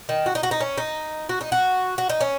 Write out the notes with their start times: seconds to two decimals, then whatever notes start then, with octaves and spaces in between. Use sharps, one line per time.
0.09 D#3
0.26 F#4
0.35 D#4
0.43 F#4
0.51 D#4
0.61 C#4
0.78 D#4
1.29 F#4
1.41 D#4
1.52 F#4
1.98 F#4
2.09 D#4
2.21 C#4